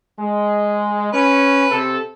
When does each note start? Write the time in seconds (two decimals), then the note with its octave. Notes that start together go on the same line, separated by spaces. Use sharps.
0.19 G#3
1.13 C#4 B4
1.71 C3 A4